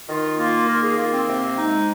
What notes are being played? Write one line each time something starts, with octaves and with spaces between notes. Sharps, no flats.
D#3 F4
A#3 F4
D#3 A#4
G#4
A#3 F4
C4
C3 C4
G#3 D#4